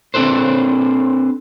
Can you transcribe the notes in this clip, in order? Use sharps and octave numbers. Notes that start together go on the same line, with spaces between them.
C4 D4 A4 B4 C5